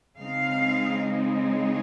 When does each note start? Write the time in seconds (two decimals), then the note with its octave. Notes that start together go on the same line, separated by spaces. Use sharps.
0.18 C#3 G#3 C4 D#4 F5
1.49 C#5